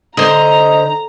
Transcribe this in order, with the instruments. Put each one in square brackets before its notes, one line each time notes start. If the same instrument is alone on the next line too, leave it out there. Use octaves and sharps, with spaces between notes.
[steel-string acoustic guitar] D3 [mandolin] C5 D#5 [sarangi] A#5